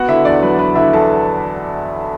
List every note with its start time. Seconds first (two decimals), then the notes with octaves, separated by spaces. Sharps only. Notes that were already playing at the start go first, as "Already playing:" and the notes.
Already playing: B3 F#4 F#5
0.08 D3 E4 E5
0.25 E2 D4 D5
0.43 F#3 B4
0.59 B3 B4
0.76 D3 E4 E5
0.93 E2 A4 A5